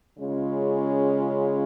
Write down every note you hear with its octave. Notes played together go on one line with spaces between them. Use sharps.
C#3 G#3 C#4 F4